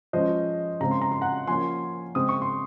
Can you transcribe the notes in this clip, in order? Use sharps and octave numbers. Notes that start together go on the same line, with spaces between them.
F3 G#3 C#4 C5 D#5
C#3 G#3 C4 A#5
C6
A#5
C6
F#5 A#5
F3 A#3 C#4 G#5 C6
C#3 G#3 C4 D#6
C#6
C6